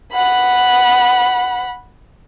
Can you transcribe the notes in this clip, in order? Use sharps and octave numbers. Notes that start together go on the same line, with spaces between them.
F#5 B5